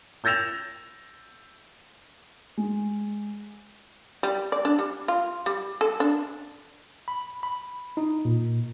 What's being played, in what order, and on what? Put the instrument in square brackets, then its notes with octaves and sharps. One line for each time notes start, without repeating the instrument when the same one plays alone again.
[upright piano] E6 G6 A6 A#6 E7 F7
G#3
[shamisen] G3
D5
D4
G3
F4
G3
A4
D4
[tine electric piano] B5
B5
D#4
A#2